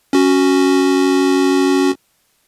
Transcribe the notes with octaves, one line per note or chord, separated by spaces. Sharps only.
C#4 F#4